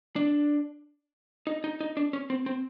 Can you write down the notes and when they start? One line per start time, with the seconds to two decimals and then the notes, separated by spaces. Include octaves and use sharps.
0.16 D4
1.47 D#4
1.64 D#4
1.81 D#4
1.97 D4
2.13 C#4
2.30 C4
2.46 C4